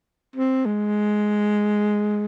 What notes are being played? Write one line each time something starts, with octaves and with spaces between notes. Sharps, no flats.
C4
G#3